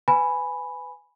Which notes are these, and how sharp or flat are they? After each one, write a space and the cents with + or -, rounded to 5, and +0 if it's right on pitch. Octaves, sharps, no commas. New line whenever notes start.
B4 +30 G#5 +0 B5 +0